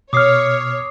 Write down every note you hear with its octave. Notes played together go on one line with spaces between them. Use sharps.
B2 C#5 D6 D#6 F6 C7